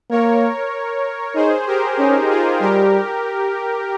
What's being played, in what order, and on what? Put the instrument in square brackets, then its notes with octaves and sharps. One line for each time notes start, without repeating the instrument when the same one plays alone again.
[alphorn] A#3 [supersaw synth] A#4 C#5
[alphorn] D#4 [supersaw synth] G#4 C5
[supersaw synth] G4 A#4
[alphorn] C#4 [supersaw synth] D#4 G4
[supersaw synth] F4 G#4
[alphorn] G3 [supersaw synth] G4 A#4